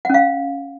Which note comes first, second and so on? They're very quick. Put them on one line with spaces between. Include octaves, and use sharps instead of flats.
F#5 C#4 F5